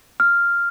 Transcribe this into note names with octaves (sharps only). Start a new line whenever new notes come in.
F6